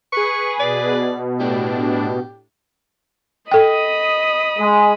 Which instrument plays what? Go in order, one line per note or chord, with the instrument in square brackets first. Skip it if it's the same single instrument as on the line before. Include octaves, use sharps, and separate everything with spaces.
[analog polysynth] G#4 B4 [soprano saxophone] C#6
[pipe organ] B2 [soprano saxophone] D5
[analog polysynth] A2 D4 [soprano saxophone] G4
[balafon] A4 G5 [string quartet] D#5 B5 D#6
[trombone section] G#3